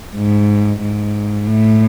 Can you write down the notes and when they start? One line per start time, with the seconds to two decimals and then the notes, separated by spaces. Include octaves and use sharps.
0.16 G#2
0.81 G#2
1.47 A2